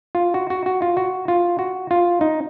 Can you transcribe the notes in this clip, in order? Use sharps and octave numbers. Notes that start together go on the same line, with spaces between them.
F4
F#4
F#4
F#4
F4
F#4
F4
F#4
F4
D#4